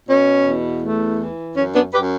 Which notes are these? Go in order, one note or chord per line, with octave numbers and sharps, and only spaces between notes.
B2 C#4
E2
A3
E3
F#2 C#4
B3 D4
F#2 G4 B4